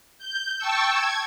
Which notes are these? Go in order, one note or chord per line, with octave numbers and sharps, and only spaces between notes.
G6
G5 A5 C#6 E6
G#6